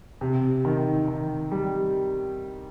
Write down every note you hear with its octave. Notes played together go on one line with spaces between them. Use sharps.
C3
D#3
D#3
G3